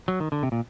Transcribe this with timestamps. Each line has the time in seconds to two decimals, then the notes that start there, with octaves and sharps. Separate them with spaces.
0.08 F#3
0.20 D#3
0.32 D3
0.43 C3
0.52 A#2